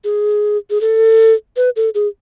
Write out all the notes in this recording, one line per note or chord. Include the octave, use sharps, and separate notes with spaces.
G#4
G#4
A4
B4
A4
G#4